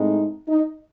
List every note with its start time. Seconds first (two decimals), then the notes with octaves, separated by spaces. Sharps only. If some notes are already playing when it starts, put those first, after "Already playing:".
Already playing: A2 G#3 C4 D#4
0.48 D#4